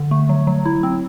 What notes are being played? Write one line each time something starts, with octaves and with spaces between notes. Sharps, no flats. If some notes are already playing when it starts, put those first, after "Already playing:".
Already playing: D3
A3
F#3
F#3
E4
C4